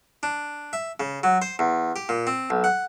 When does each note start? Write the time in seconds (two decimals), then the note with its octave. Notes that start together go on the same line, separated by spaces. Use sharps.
0.23 D4
0.73 E5
1.00 C#3
1.23 F#3
1.42 C5
1.59 E2
1.96 G4
2.09 A#2
2.27 C4
2.50 B1
2.64 F#5